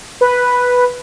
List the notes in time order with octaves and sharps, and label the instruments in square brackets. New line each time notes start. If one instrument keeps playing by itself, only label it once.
[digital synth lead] B4